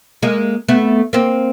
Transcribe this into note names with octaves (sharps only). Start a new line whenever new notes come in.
G#3 A#3
A3 B3
A#3 C4